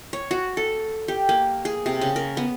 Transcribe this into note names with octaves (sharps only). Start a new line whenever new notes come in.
C#5
F#4
A4
G4
A#3
G#4
C3
C#3
A#4
B3